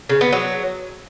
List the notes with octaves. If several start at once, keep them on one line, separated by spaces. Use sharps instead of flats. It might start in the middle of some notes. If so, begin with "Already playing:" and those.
C#3
B3
F#3